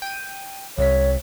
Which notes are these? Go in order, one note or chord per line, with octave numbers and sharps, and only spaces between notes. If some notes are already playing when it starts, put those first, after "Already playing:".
G5 D#7
C2 C3 C#5 B6